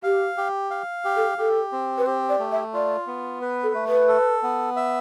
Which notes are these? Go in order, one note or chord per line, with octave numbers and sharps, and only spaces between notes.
G4 F5
G4
F5
G4
A4
G4 A4
C4
B4
G4 C5
D5
A3
E5
F4 D5
B3
B4
A4
A3
B4
A4
B3
E5